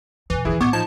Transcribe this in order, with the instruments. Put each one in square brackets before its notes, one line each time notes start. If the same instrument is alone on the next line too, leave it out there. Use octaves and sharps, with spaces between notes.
[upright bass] E2 B2 [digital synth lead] E3
[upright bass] D#2 D3 [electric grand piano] E4 G#4
[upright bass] A2 E3 [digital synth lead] B3 [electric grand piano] C#6 D6 G#6
[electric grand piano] F3 D#4 [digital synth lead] A5